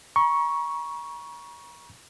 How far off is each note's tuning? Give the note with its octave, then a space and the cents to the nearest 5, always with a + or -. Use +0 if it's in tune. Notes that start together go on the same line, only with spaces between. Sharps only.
A#5 +40 C#6 +0